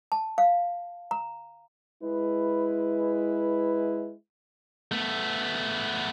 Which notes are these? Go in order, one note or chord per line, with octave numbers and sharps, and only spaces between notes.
A5
F5
A#5
G#3 E4 B4
A3 B3